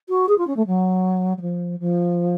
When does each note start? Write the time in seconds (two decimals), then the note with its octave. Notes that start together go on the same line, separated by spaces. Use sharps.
0.09 F#4
0.28 G#4
0.38 F4
0.47 C#4
0.56 A3
0.66 F#3
1.37 F#3
1.41 F3
1.79 F3